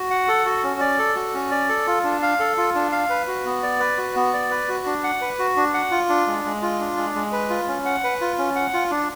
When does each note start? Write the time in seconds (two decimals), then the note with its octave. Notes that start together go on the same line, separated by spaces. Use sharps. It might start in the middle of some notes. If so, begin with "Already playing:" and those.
Already playing: F#4
0.10 F#5
0.28 A4
0.45 F#4
0.63 C#4
0.80 D5
0.99 A4
1.15 F#4
1.34 C#4
1.51 D5
1.69 A4
1.87 F4
2.04 D4
2.22 F5
2.40 A4
2.57 F4
2.75 D4
2.92 F5
3.10 B4
3.28 F#4
3.45 B3
3.63 D5
3.80 B4
3.98 F#4
4.16 B3
4.34 D5
4.51 B4
4.69 F#4
4.86 D4
5.04 F#5
5.21 B4
5.39 F#4
5.56 D4
5.74 F#5
5.91 F4
6.09 D4
6.27 G#3
6.45 G#3
6.62 F4
6.80 D4
6.97 G#3
7.15 G#3
7.32 B4
7.50 F4
7.68 C#4
7.86 F#5
8.04 B4
8.21 F4
8.38 C#4
8.55 F#5
8.73 F4
8.91 D4